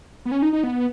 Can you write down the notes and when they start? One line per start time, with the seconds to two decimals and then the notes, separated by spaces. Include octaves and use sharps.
0.26 B3
0.32 C#4
0.42 D#4
0.53 D#4
0.64 B3